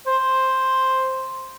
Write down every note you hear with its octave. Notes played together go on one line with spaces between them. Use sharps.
C5